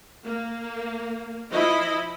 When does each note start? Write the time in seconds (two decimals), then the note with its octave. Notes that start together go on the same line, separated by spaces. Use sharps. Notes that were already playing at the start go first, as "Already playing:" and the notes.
0.24 A#3
1.51 F3 E4 D#5 B5